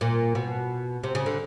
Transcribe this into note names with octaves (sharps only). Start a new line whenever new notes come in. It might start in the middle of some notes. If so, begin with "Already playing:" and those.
A#2
B2
C3
C#3
D3